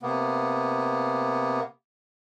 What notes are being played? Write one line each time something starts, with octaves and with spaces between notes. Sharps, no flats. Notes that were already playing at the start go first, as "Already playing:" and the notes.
C3 A#3 B3